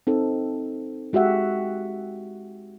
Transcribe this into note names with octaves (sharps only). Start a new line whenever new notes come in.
C4 D#4 A4
G#3 F#4 G4 E5 F#5